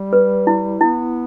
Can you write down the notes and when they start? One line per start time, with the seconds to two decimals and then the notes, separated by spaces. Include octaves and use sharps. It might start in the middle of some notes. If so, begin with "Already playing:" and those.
Already playing: G3
0.13 B4
0.47 E4
0.81 B3 E4